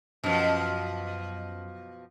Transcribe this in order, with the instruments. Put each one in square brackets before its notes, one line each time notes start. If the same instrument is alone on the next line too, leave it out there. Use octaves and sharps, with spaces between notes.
[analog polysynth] F#2 [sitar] B2 F3